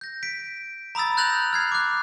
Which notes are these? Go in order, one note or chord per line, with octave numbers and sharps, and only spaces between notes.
G6 A#6
B6 D7
A#5 B5 D#6 E6 A6
F#6 G6 A6 A#6 F7 F#7
F6 G#6 C7
D6 F#6